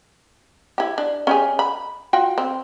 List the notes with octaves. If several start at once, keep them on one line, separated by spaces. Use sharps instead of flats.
E4 G4
D4
C#4 G4 G#4
B5
F4 F#4 G5
C4